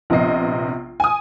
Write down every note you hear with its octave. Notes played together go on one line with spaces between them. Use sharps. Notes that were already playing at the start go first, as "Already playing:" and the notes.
A#1 C3 B3 D#5 C7
G#5 D#6